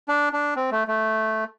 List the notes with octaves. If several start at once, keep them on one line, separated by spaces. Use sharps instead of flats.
D4
D4
C4
A3
A3